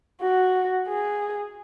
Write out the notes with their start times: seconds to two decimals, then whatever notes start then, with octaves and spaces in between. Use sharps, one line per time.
0.22 F#4
0.88 G#4